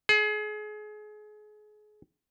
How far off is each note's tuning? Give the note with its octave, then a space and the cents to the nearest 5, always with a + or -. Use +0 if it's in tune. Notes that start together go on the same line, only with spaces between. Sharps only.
G#4 +30